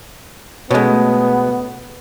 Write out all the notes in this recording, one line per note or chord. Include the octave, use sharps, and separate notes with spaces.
B2 G#3 A3 B3 C#4